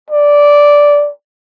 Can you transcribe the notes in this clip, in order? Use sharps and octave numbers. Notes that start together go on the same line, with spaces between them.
D5